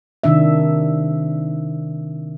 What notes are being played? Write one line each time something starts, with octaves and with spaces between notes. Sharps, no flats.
C3 D#3 D4 E5